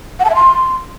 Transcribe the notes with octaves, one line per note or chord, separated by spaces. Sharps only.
F#5
A5
E5
C6